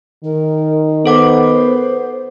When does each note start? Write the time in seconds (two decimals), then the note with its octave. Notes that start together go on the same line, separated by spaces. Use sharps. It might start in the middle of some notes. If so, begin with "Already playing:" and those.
0.24 D#3 A#4
1.06 B3 A4 C5 F#5 D6